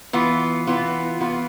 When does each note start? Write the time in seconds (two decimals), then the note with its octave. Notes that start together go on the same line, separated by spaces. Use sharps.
0.13 E3 B3 F4
0.67 E3 B3 F4
1.20 E3 B3 F4